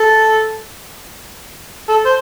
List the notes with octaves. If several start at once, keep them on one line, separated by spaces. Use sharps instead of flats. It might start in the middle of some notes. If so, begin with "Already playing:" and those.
Already playing: A4
A4
C5